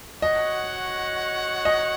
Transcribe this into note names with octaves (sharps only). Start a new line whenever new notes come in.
F#4 C#5 D#5 F#5
D#5